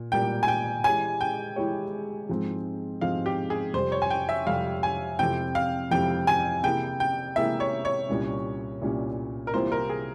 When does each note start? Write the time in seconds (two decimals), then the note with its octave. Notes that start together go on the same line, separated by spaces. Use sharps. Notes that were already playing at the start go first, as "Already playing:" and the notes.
Already playing: A#2
0.12 A#2 G3 A#3 G5
0.43 G#5
0.48 G5
0.84 E3 G#3 E4 G4 C#5 G#5
1.21 G5
1.56 E3 G#3 E4 G4 C#5
2.29 G#2 F3 G#3 C4
3.01 G#2 F3 G#3 C4 F5
3.26 G4
3.50 G#4
3.74 F2 C3 G3 C5
3.92 C#5
4.02 G#5
4.10 G5
4.29 E5
4.47 F2 C3 G3 F5
4.83 G#5
5.19 F2 C3 F3 C4 E4 G5
5.55 F5
5.91 F2 C3 F3 C4 E4 G5
6.27 G#5
6.63 C3 E3 A#3 E4 G#4 G5
7.00 G5
7.36 C3 E3 A#3 E4 G#4 E5
7.60 C#5
7.85 C#5
8.09 C2 A#2 G3 C#4
8.81 C2 A#2 G3 C#4
9.47 A#4
9.54 C2 C3 E3 A#3 F4 C5
9.72 A#4
9.90 G#4